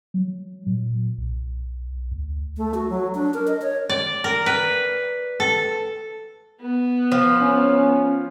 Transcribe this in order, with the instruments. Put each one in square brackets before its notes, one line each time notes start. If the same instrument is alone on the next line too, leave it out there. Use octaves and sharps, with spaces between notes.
[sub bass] F#3
A#2
B1
D2
[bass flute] A3
F#4
F#3
D4
A#4
D#5
C#5
[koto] D5
A#4
B4
A4
[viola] B3
[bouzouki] F3
[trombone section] C#4